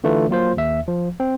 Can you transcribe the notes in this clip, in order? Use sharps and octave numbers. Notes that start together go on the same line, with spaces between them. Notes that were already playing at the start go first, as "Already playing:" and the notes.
D3 E3 A3 D4 F4 B4
F#3 A#3 F4 C5
D#2 E5
F3
C4